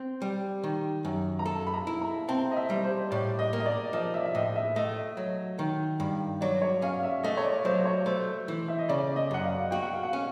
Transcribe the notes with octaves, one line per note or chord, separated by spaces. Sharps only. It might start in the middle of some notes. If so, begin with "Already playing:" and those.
Already playing: C4
G3
D#3
F#2
A#5
A4 A5
B5
A#5
E4
A#5
C4 A5
D#5
E5
G3
C5
A2 D5
D#5
A#3
D#5
D5
F3 D#5
E5
E5
A2 D#5
E5
A3 D#5
F#3
D#3
G2
F#3 D5
C#5
C#4 F5
E5
A3 D#5
C#5
D5
F#3 C5
C#5
A3 C5
E3
E5
D#5
C#3 D5
D#5
F#2 F#5
F5
F#4 G5
F#5
F5
F#5
C#4